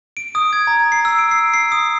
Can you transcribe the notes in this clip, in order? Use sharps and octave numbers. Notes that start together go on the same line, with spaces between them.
D7
D#6
G#6
A#5
C7
E6
D7
C7
C7
D#6